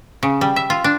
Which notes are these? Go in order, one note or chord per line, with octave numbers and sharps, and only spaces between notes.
C#3
G3
E5
F4
D4